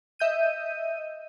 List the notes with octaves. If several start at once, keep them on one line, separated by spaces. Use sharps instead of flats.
D#5 E5 G6 D#7